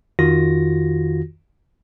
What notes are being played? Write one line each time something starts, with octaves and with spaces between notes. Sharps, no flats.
F2 D#3 F4 F#4 A#6